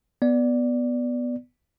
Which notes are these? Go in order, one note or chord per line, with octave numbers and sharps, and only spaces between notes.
B3 D5